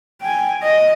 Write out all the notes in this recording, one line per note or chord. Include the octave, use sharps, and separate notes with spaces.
G5 G#5
D#5